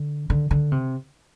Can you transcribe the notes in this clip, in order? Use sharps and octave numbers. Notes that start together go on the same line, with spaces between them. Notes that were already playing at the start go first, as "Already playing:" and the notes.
Already playing: D3
D3
D3
C3